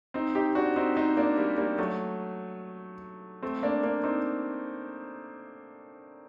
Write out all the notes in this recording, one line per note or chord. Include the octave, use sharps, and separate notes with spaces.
C4 D#4
D#4 G4
D4 F#4
C4 D#4
C4 D#4
A#3 D4
G3 A#3
G3 A#3
F#3 A3
A3 C4
A#3 D4
A#3 D4
C4 D#4